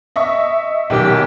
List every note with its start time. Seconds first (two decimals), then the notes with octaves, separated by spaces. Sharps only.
0.16 D#5 E5 C#6
0.90 B1 D#3 G4